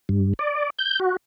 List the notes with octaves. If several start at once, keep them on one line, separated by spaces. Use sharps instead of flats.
G2
D5
G6
F#4